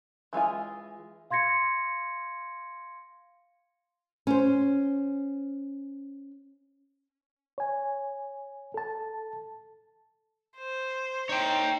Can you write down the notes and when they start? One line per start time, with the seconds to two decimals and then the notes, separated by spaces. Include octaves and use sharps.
0.33 E3 G#3 F4 G#5
1.30 F5 C6 G#6 A#6 C#7
4.27 C#4 C5
7.58 C#5 G#5
8.74 A4 A5
10.57 C5
11.29 D#4 C#5 G5